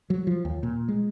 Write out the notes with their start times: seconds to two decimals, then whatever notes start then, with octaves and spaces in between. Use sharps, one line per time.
0.10 F#3
0.27 F3
0.45 D#2
0.63 A#2
0.88 G#3